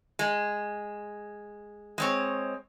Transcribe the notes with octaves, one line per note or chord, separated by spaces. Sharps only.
G#3
G#3 C4 C#5